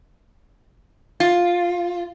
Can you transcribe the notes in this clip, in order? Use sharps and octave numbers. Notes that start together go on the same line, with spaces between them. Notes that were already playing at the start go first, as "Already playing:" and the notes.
F4